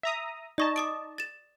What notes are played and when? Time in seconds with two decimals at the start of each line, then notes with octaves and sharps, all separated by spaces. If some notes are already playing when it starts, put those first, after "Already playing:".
0.03 E5 A#5 D#6
0.58 D#4 D5 D#5 A5 C#6
0.76 D6 D#6 D7
1.18 A6 E7